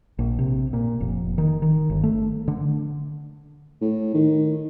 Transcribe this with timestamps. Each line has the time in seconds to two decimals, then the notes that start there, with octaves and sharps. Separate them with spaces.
0.19 A#1
0.39 C3
0.73 A#2
1.00 F1
1.38 D#3
1.62 D#3
1.90 G1
2.03 A3
2.48 D3
3.81 A2
4.14 D#3